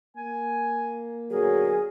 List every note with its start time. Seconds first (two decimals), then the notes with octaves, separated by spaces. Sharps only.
0.17 A#3 G#5
1.30 B2 D3 F#3 G#4 A#4